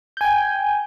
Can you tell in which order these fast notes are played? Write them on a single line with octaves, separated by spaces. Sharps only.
G6 G#5 G5